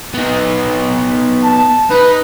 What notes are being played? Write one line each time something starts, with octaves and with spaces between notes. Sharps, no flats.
B3 D#4
A5
D#4 B4